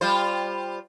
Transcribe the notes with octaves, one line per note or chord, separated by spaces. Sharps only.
G3 F4 C5